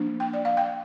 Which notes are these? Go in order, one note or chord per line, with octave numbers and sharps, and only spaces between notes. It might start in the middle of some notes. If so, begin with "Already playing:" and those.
Already playing: F3 A#3 D4
G5
D5
F5
G5